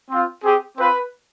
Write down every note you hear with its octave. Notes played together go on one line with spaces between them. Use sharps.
C4 F4
C4 G4 G#4
C4 F4 B4